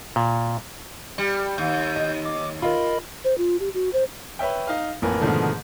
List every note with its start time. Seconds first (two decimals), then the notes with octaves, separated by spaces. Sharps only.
0.16 A#2
1.18 G3
1.58 D#2 G6
1.96 D#5
2.25 D6
2.62 F4 A#4 D#5 B5
3.25 C5
3.38 F4
3.60 G4
3.74 F#4
3.93 C5
4.39 B4 C#5 E5 G5
4.67 D#4 F5
5.02 A1 F2 A#3 A#4 B4 G#5
5.21 G#2 B2 D3 D#3 F3 A3